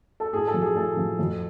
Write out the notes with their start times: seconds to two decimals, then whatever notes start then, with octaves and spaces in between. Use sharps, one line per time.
0.20 A4
0.33 A2 G#4
0.47 A4
0.54 F3
0.62 G#4
0.76 A2 A4
0.97 F3
1.19 F2